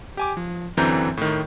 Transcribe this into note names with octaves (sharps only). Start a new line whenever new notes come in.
G4 G#5 D6
F3
F#2 D3 E3 C4 A#5 G6
A2 D#3